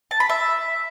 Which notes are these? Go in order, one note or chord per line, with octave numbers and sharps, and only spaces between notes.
A5
B5
E5